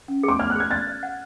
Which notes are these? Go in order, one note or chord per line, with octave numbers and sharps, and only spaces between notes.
C#4
G#4 D6
D5 F6
F#6
G#4 G#6
D5 A6
D5
F#5